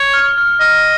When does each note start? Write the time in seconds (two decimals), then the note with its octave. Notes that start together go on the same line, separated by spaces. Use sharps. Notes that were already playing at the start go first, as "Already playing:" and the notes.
Already playing: C#5
0.14 F6
0.38 F6
0.60 D#5 F6